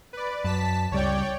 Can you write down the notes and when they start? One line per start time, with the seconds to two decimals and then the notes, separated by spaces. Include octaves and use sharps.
0.13 B4 D5
0.44 F#2 A5 B6
0.92 C#2 G3 C#5 D5 G5